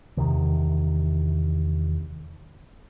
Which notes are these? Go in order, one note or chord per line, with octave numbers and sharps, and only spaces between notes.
E2 C3 D#3